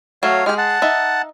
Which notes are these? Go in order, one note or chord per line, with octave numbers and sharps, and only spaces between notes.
F#3 A3 F#4 C#5 F5
G#3 G4 G#4 F6
F#5 A5
D#4 E5